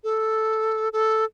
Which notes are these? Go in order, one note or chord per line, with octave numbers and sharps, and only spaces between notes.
A4
A4